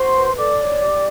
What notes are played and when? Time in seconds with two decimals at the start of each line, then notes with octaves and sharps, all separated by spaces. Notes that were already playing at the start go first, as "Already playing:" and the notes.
Already playing: F#4 C5 C6
0.15 B4
0.37 A4 D5 D6
0.60 C#5
0.81 G4